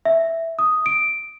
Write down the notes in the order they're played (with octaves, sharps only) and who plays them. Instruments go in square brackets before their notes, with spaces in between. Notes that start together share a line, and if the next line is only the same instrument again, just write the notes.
[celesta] E5
D#6
D7